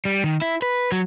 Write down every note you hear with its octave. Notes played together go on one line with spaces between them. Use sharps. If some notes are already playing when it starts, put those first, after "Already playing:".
G3
D#3
E4
B4
F#3